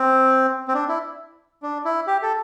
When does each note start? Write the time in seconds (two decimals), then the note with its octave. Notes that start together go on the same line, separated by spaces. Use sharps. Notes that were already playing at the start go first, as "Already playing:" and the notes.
Already playing: C4
0.68 C4
0.74 D4
0.88 E4
1.62 D4
1.85 E4
2.07 G4
2.22 A4